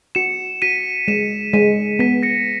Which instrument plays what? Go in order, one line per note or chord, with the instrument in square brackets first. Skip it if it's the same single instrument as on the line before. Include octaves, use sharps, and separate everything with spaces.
[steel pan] F#4 [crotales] C#7 E7
[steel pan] F#4 [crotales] B6 D#7
[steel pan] G#3 [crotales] C#7 E7
[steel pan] G#3 [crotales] B6 D#7
[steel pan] B3 [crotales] B6 D#7
[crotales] A#6 C#7